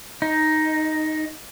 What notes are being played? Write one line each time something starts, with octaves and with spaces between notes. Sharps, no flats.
D#4